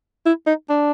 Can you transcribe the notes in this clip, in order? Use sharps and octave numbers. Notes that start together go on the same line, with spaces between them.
E4
D#4
D4